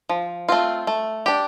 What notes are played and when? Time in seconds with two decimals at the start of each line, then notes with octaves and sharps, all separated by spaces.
0.09 F3
0.49 A3 C4 F4
0.87 A3
1.26 D4 G4